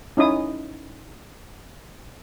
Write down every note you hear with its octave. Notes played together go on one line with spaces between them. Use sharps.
C#4 D#4 E4 D#6